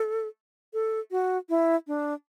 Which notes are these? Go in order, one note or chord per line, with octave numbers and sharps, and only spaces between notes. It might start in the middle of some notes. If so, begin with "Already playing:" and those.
Already playing: A4
A4
F#4
E4
D4